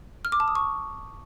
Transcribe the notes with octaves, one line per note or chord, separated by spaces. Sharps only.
F6
D6
A5
D#6
C#6